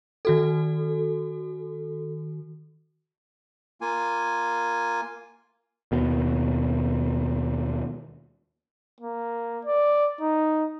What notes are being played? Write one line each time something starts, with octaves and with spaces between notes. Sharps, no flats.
D#3 F#4 A4
A#3 F4 G#5
D#2 B2
A#3
D5
D#4